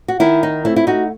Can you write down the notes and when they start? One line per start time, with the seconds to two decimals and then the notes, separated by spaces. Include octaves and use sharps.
0.08 F#4
0.20 D#3 E4
0.43 D#4
0.65 A3 C4 E4
0.76 E4
0.87 D#4 F#4